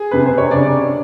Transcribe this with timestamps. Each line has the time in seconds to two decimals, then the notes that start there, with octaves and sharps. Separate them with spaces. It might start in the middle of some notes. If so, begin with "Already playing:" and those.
Already playing: G#4 G#5
0.11 C3 B4
0.25 C5
0.38 C#5
0.51 C#3 D4 D5